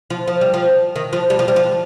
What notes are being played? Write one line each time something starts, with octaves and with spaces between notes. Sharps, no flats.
F3
F3
G3
F3
D#3
F3
G3
F3
G3
F3